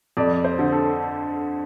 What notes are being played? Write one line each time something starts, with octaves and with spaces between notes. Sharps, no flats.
F2 D5
C5
D3
A4